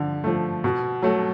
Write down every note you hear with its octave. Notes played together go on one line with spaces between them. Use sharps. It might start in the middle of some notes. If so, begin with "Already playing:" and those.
Already playing: D3 F3
F3 A3
B2
F#3 A3